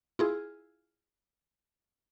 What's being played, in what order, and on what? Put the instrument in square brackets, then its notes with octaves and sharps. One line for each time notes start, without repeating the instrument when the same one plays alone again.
[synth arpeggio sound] E4 F4 G#4